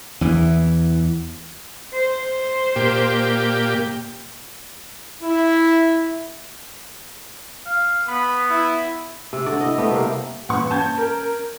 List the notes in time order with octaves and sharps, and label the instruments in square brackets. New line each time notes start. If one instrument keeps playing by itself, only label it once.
[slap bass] E2 E3
[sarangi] C5
[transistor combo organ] A#2 G4
[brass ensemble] E4
[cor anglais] F5
[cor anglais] B3 [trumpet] B5
[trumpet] E4
[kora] C3
D3 F#4 D5
E4 D#5
G3 A3 B3 G4
C3 A#3
[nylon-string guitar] A#2 E3 C#4 [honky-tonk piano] F#5 C#6
[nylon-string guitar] C#4 [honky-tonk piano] A5 G6 G#6
[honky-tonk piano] A#4